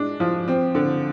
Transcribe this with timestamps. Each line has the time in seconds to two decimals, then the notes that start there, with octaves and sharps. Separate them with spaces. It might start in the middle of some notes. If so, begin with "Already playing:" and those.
Already playing: G#3 D4
0.20 F3
0.48 C4
0.75 D3